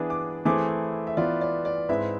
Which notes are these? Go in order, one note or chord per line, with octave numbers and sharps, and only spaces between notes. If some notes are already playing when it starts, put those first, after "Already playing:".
Already playing: E3 B3 D4 G#4 D5
D6
E3 A3 C4 E4 G#4 D6
E5
E3 B3 F4 D5
D5
D5
G#2 G#3 C4 E4 B4 E5